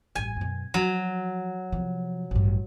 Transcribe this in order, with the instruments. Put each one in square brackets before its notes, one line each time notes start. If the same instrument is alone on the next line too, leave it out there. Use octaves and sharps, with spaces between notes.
[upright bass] A1 G2 [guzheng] G#5
[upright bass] F#2 B2
[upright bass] F3 [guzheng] F#3
[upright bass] C3 F3
A1 G2